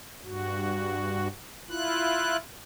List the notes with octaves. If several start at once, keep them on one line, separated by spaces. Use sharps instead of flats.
G2 F#4
E4 F4 F#6